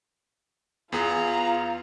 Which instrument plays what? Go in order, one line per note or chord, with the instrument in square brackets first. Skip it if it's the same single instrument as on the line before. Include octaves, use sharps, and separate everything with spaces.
[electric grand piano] E2 B3 G#4 [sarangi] F4 [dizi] A#5